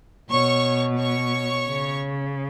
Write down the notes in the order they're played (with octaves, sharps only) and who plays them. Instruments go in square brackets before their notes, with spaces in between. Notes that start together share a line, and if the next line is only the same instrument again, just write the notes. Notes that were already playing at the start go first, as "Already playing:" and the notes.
[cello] B2 [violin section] C#5 C#6
[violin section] C#5 C#6
[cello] C#3